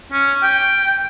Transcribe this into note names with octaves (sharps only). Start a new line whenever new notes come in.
C#4
G5